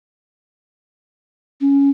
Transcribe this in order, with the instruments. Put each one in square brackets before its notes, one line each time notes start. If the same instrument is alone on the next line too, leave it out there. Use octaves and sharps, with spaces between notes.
[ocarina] C#4